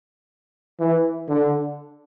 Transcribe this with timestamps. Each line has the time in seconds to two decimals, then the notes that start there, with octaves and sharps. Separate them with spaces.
0.80 E3
1.29 D3